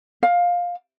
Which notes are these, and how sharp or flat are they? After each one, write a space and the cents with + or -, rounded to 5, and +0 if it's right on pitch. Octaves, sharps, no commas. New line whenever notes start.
F5 +15